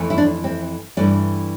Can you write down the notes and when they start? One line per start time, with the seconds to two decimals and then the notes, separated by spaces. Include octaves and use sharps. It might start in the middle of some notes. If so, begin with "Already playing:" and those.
Already playing: F2 E3 A3
0.10 E4
0.18 D4
0.44 C4
0.97 G2 E3 A3 D4